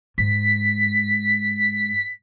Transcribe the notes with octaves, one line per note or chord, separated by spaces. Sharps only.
G#2 B6